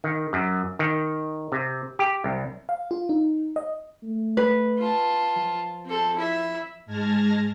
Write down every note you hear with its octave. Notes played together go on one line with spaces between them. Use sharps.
D#3
F#2
D#3
C3
G4
C2
F5
F4
D#4
D#5
A3
B4
F4 A5
F3
C4 A4
E4 E5
G#2 G#3 A5 F6 G#6 A#6